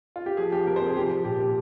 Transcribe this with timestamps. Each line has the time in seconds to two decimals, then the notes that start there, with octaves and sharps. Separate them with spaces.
0.16 F4
0.26 G4
0.37 F3 G#4
0.52 F3 G4
0.67 C3 A#4
0.76 C5
0.82 C3 G#4
0.96 F3 G4
1.10 F3
1.25 A#2 G4
1.40 A#2 G4